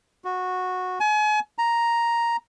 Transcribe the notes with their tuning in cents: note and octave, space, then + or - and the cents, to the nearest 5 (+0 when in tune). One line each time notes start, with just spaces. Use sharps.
F#4 -10
G#5 +35
A#5 +5